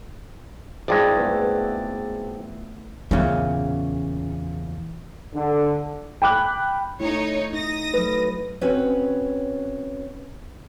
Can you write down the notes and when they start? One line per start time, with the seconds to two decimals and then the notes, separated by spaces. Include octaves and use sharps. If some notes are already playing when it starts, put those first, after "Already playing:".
0.88 G#1 G2 G#3 C#4 E4 F4 D5
1.17 A3 B3 B4
3.11 E2 A#2 C#3 C#4
5.34 D3
6.22 G5 B5 D6 F#6
7.00 A3 D#4 E4 C#5
7.53 D#4 D#6 A#6
7.94 F#3 A3 B4
8.61 C4 C#4 F#4 B4 C#5